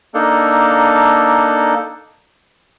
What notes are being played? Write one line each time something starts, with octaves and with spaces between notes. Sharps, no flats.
A#3 D4 D#4 A4